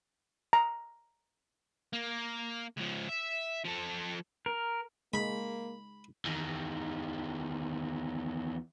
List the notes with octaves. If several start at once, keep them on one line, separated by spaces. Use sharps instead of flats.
A#5
A#3
C#2 F3
E5
F3 A4
A#4
G#3 A#3 B5
E2 D#3